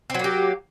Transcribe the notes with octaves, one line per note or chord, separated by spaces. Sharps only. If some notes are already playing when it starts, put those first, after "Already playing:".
F#3 A#3 C4 G4